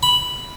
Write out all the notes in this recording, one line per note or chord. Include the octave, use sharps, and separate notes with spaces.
B5